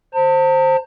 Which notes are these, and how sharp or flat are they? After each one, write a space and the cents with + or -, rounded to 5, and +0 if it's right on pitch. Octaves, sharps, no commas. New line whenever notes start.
C5 +10 A5 +40